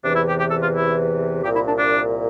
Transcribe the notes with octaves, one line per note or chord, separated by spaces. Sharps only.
E2 C3 E3 D4
E4
G4
G4
A4
F4
E4
C2 A#2 G4
E4
D4
D4